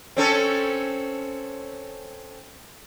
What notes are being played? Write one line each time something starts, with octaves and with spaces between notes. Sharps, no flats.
C4 C#4 A4